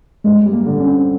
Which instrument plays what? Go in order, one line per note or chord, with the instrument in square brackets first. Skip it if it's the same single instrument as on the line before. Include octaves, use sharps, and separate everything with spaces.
[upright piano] G2 [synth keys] G#3
[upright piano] G3
[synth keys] A#3
[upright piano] D3
[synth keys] C#4
[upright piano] C4